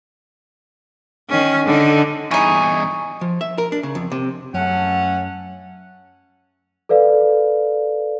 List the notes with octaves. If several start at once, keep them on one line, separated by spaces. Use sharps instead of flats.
D#3 C#4
D3 D#4
E2 G2 E3 D#4 G#4 E5 G#5 C#6
F3
E5
A#4
D4
C#3
F2
C3
F#2 A3 C#4 F#5
A4 B4 D5 F5